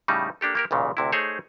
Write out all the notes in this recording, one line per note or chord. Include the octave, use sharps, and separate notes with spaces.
A2 C#3 G3 D#4
A#3 D4 G4 A4
A#3 G4 A#4
B1 E2 A#2 C#3
D2 C3 E4
A3 D#4 G#4 C5 C#5